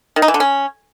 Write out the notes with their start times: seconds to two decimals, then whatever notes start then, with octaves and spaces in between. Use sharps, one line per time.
0.16 D#3
0.22 D#4
0.28 E3
0.34 D3
0.40 C#4